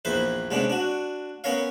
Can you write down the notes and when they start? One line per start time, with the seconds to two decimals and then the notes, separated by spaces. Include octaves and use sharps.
0.05 A#1 E2 E4 B4 C5
0.51 C3 G#3 B3 C#4 D4
0.70 D4 F#4
1.44 B3 C#4 A#4 C#5 F5